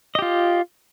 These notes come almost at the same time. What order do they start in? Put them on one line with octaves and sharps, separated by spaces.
D#5 G4 F4